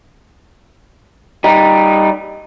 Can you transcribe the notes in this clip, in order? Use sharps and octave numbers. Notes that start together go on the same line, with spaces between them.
G3 D#4